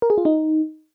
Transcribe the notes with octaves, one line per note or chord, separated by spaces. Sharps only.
A#4
G#4
F4
D#4